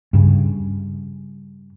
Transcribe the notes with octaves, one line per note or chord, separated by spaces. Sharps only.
G2 C#3